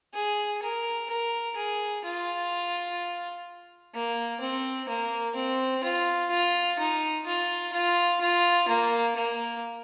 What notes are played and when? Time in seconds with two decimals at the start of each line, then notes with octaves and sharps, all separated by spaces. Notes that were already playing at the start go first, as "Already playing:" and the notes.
0.14 G#4
0.62 A#4
1.10 A#4
1.56 G#4
2.05 F4
3.94 A#3
4.41 C4
4.88 A#3
5.36 C4
5.84 F4
6.31 F4
6.79 D#4
7.26 F4
7.73 F4
8.21 F4
8.68 A#3
9.16 A#3